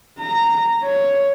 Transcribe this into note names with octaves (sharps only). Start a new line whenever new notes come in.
A#5
C#5